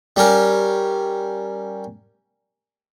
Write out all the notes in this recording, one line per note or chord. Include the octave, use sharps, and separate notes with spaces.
G3 C#4 A#4